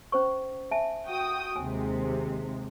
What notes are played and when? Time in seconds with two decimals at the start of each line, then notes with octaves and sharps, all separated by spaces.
0.12 C#4 C5 C#6
0.71 E5 G#5 A5
1.05 F#4 G5 D#6
1.56 D#2 C3 G#3 G#5